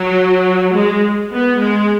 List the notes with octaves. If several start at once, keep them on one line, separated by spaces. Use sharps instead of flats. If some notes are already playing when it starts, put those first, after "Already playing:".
Already playing: F#3
G#3
B3
G#3